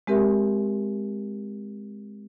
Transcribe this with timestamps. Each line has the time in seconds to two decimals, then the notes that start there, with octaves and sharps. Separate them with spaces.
0.07 G#3 C4 G4 A#4 E5